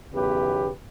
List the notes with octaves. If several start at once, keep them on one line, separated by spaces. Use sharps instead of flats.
B1 E2 C#3 G4 B4